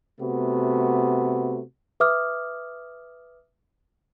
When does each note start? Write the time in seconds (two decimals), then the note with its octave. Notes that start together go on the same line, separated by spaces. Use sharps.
0.20 C3 A3 B3 F#4
2.00 B4 E5 D6 D#6 F6